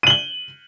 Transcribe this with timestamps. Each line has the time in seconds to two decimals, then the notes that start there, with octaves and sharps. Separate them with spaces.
0.03 D#7
0.07 F#7
0.10 G7